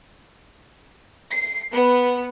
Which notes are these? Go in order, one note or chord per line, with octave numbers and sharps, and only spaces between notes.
C7
B3